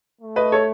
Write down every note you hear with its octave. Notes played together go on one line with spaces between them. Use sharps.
A3
B4 D#5
A4 C#5